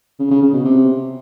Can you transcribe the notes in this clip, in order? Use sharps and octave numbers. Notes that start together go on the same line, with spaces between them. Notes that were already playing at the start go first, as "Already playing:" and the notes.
C#3
C#3
C#3
B2
C3